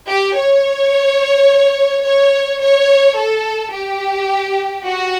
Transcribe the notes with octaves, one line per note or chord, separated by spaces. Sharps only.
G4
C#5
C#5
C#5
A4
G4
F#4